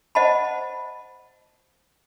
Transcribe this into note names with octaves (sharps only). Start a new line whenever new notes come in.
C5 D#5 F#5 A5 B5